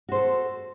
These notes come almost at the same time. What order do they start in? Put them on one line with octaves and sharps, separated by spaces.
F#4 C5 A4